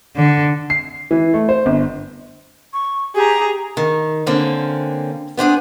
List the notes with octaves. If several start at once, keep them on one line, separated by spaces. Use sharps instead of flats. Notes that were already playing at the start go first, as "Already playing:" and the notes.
D3
C7
E3
A3
C5
G1
C#6
G4 G#4 A#5
D#3
D3 A#3 C4 C#4
B3 C4 D4 G#4